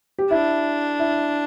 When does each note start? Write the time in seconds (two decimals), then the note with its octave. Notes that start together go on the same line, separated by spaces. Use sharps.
0.19 G4
0.31 D4 E4
0.99 E4